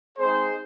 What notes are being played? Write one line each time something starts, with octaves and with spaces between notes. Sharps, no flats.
G#3 C4 D#4 G#4 C5